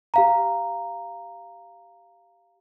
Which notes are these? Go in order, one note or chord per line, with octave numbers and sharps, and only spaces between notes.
G4 F5 A#5